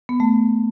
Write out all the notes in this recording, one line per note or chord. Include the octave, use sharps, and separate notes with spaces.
B3
A3